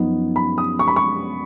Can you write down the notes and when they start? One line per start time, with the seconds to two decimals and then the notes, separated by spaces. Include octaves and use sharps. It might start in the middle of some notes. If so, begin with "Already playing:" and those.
Already playing: F#2 F3 B3 D#4
0.36 B5
0.58 D#6
0.79 C#6
0.88 B5
0.96 C#6